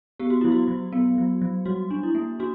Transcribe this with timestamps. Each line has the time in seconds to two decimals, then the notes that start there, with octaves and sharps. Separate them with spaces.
0.20 B3 G4
0.30 F#4
0.41 F#3 E4
0.52 F#4
0.68 F#3
0.92 B3
1.18 F#3
1.42 F#3
1.66 G3 F#4
1.91 D4
2.03 E4
2.15 A#3
2.39 D4 F#4